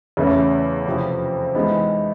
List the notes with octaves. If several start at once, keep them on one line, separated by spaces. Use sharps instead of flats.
E2 C#3 E3 A3 C#4
F2 C3 F3
E3 G#3 B3 D#4